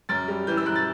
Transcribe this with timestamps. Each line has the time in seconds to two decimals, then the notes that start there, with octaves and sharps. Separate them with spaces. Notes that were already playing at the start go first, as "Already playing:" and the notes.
0.09 F#2 A6
0.28 G3
0.47 E3 G6
0.57 E6
0.66 F#2 F#6
0.76 A6